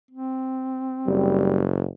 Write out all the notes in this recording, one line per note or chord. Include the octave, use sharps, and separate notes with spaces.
C4
F#1 G3